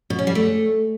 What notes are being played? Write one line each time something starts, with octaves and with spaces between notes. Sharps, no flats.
B2
C#4
G3
A3